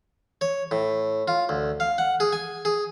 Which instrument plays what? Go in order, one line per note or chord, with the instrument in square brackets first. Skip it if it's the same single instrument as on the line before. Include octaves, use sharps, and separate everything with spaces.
[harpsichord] C#5
A2
F4
D2
F5
F#5
G#4
G#5
G#4